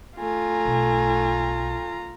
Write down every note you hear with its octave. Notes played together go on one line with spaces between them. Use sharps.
A3 F4 G#5 A#5
B1